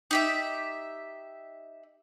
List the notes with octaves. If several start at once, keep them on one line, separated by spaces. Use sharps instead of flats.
D#4 G4 E5